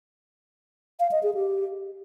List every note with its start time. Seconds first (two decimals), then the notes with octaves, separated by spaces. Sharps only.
1.00 F5
1.11 D#5
1.23 G#4
1.35 G4